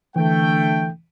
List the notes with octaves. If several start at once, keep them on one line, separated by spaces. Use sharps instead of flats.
D3 E3 A3 G5